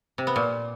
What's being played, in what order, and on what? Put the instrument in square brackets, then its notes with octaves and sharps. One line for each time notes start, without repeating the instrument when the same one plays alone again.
[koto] C3
B3
A#2